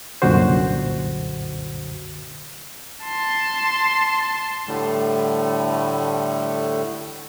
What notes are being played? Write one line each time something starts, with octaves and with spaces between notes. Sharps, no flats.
C2 F#2 A#2 D3 F#4 C5
A5 C6
A2 D3 G3 A3